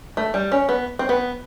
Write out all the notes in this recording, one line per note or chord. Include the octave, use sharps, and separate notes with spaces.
A3
G3
C#4
B3
C4
B3